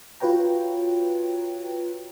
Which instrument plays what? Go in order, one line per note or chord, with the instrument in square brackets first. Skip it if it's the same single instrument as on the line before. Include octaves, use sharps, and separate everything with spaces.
[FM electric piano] F4 F#4 B4 C#5 G5 A#5